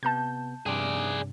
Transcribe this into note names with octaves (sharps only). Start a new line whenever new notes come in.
C3 B3 A5 G6
G2 C3 G#4 D5